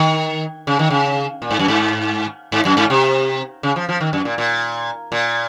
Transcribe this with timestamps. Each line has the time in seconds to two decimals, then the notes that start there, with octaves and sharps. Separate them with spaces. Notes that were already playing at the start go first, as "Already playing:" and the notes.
Already playing: D#3
0.67 C#3
0.79 D#3
0.90 C#3
1.42 A#2
1.51 G#2
1.59 F#2
1.68 G#2
2.52 G#2
2.65 F#2
2.77 G#2
2.90 C3
3.63 C#3
3.76 F3
3.89 F3
4.01 D#3
4.13 F#2
4.25 A#2
4.38 A#2
5.12 A#2